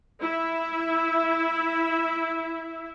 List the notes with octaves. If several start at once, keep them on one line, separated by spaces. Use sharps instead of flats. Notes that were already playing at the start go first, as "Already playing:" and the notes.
E4 E5